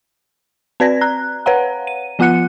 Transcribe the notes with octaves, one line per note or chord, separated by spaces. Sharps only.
C4 B4 D5 G#6 A#6
A#5 F#6
B4 C#5 F5 F#5 A#5
D#7
F3 B3 F4 F#5 F#6 C#7